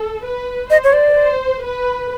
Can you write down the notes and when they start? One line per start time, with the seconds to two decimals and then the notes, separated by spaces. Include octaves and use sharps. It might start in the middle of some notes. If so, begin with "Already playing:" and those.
Already playing: A4
0.24 B4
0.70 C5 D#5
0.84 C#5
0.93 D5
1.16 C5
1.63 B4